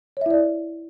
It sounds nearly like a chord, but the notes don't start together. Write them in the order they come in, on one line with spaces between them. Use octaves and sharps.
C#5 E5 E4 D5